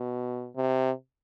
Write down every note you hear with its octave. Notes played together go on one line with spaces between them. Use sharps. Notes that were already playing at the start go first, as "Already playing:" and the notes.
Already playing: B2
C3